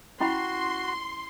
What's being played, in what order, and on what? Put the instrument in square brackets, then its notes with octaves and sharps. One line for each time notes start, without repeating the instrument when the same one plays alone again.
[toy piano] C#4 E4 B5 [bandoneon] F#4 [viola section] C6